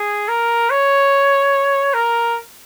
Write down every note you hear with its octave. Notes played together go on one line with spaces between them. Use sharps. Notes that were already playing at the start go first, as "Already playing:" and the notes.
Already playing: G#4
A#4
C#5
A#4